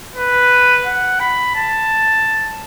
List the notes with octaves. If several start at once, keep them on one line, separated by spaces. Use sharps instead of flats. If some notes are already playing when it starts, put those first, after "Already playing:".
B4
F#5
B5
A5